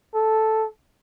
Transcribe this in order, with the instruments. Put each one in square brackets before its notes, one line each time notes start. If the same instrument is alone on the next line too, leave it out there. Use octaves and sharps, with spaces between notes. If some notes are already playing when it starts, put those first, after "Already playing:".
[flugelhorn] A4